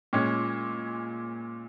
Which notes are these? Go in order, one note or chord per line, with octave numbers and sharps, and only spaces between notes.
A#2 G#3 C#4